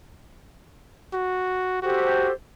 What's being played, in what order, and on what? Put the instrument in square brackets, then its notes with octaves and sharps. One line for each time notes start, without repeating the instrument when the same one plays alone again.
[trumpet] F#4
[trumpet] F#4 [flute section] G4 A4 C5